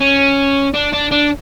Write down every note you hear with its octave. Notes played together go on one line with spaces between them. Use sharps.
C#4
D4
D4
D4